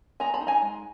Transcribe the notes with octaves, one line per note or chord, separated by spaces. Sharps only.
B3 G#5 A#5
A5 B5
D#4
G#5 A#5
G#3